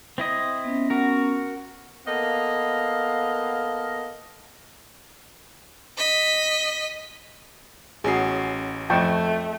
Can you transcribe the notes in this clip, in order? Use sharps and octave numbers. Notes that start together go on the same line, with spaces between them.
C4 E4 D#5
B3 C#4
F#4 A#4
A#3 B3 A4 D#5 F5
D#5 B6
A1 C#4 F#4 G#4 C7
F2 A3 G5 A5 C#6